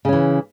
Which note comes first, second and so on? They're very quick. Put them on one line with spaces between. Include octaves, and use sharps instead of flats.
C#3 C#4 E3